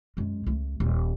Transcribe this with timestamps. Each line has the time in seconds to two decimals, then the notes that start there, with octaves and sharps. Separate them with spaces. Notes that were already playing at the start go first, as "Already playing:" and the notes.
0.17 F#2 G#3
0.46 C#2 A3
0.80 D#1